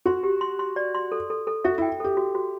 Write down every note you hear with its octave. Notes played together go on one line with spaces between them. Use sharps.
F#4 C6
G4
C6
C6
D5
C6
A4
A4
A4
F#4 E5
E4 G5
G4 A4
F#4
F#4